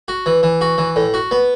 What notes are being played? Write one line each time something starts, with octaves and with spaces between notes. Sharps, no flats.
F#4
E3
E3
F#4
E3
A2
F#4
B3